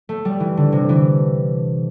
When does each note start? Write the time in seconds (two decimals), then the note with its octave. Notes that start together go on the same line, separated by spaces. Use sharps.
0.09 A3
0.25 G3
0.40 E3
0.57 D3
0.72 C3
0.89 E3